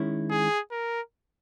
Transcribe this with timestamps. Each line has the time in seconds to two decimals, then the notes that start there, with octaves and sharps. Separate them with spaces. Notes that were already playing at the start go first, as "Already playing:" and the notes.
Already playing: D#3 G#3 C#4 E4
0.30 G#4
0.71 A#4